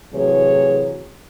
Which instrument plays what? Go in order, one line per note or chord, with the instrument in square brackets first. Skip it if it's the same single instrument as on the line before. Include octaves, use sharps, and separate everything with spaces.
[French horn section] A2 C3 E3 F#3 G#4 C#5